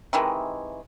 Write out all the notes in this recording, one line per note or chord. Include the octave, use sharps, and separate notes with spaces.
C3 D#3 E3 G#3